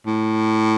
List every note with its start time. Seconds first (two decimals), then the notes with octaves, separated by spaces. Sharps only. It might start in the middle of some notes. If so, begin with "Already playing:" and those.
0.07 A2